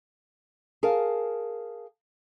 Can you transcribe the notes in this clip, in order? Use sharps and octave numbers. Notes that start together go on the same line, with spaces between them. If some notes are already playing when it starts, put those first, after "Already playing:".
G#4 A#4 F5 A5